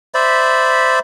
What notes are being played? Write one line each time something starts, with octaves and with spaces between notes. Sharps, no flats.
C5 D5 E5 B5